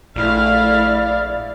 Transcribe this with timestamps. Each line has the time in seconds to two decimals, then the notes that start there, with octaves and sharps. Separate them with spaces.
0.16 A#1 A3 E4 D5 F5